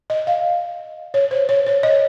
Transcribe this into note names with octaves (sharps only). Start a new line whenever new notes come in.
D#5
F5
C#5
C5
C#5
C#5
D#5